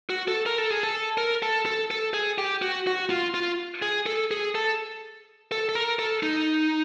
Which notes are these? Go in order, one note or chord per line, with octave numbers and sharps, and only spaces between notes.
F#4
A4
A#4
A4
G#4
A4
A#4
A4
A4
A4
G#4
G4
F#4
F#4
F4
F4
G#4
A4
G#4
A4
A4
A4
A#4
A4
D#4